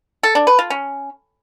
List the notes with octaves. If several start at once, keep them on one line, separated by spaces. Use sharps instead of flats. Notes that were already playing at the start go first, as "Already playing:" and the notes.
A4
D4
B4
F4
C#4